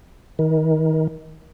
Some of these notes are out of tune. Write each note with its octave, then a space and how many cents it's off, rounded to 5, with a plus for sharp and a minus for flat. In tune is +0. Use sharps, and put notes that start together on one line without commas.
D#3 +30